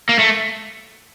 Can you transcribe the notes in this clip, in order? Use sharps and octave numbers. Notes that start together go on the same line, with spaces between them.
A#3
A3